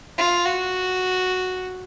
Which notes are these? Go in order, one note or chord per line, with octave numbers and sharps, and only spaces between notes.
F4
F#4